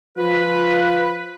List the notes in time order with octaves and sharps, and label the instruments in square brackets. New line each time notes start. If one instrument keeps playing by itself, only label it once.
[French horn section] F3 F4 [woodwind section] B4